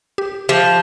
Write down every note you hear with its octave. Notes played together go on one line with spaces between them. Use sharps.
G4
F3 G4 E5